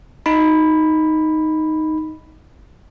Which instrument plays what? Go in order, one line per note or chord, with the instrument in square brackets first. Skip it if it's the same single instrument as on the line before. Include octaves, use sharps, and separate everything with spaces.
[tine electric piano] D#4 B5